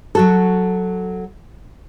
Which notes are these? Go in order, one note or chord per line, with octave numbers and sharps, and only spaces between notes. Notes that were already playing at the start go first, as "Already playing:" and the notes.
F#3 F#4 A4